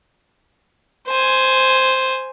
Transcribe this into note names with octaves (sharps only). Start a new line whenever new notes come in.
C5 G#5